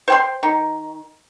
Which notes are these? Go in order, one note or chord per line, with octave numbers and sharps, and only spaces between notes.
C5 G5 C6
D#3